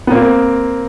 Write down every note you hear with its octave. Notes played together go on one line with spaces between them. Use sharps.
B3
A#3 C4